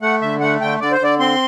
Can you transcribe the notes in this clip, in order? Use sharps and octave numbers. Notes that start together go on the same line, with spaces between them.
A3 F#5
D3 E5
A3 F#5
D3 G5
D3 D5
C5
D3 D5
C4 C6